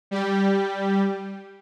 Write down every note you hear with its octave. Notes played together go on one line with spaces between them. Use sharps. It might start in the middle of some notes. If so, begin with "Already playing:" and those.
G3 G4